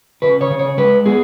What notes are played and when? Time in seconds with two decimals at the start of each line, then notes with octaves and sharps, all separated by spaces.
0.22 C#3 B4
0.41 C#5
0.50 C#3
0.59 C#5
0.77 G#3 B4
1.06 B3 G#4